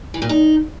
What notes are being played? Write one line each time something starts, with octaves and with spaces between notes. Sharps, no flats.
E3
A#2
D#4